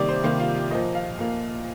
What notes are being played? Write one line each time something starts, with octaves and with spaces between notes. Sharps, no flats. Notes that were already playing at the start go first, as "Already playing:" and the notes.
Already playing: C3 D#3 G3 A#3 D5
C5
C3 D#3 G3 A#3 C5
F4
G4
A#2 F3 A#3 D#5
F5
A#2 F3 A#3